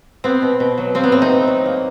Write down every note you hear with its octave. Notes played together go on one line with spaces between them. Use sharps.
B3 C4
B2
B2
F#3
A#3 C4
B3
A2 C4
D#4
A2
F#3
A#3